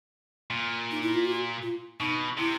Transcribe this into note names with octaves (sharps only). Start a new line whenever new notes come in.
A#2
D#4
E4
F4
F#4
F4
B2 D#4
C3 E4